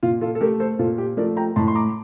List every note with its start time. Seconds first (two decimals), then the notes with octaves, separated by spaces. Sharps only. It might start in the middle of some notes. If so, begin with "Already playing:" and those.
0.03 A#2 F4
0.21 F4 A4
0.35 A4
0.41 A3 G4 A#4
0.60 A4 C5
0.79 A#2 F4 A4
0.98 G4
1.17 F3 A3 A#4 D5
1.37 G5 A#5
1.56 A2 A5 C6
1.68 C6
1.75 A#5 D6